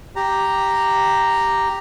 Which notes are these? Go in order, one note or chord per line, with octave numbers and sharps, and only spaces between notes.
G4 A#5